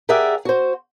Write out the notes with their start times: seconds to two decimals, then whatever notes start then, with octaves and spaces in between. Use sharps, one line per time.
0.09 G4 G#4 A#4 D5 E5 F#5
0.45 F#4 C5